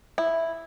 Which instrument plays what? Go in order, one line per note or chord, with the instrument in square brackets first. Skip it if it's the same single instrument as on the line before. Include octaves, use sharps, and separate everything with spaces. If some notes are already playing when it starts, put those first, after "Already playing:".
[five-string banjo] E4